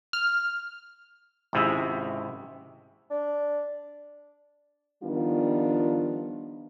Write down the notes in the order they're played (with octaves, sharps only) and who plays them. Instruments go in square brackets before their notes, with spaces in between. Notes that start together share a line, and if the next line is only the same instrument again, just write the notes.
[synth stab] F6
[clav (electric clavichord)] G#1 C#2 C3 E4 G#4 E5
[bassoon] D4
[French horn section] D#3 F3 G3 B3 D4 F4